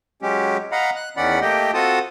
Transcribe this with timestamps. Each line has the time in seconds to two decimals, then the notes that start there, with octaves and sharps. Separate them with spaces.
0.23 F#3 G#3 C#4 G4
0.72 D#5 F5 F#5 A#5 B5
0.96 F#6
1.17 E2 D#3 C#4 D5 F#5 B5
1.41 A3 A#3 G4 D#5 G5
1.74 C4 F4 F#4 A4 A5 D#6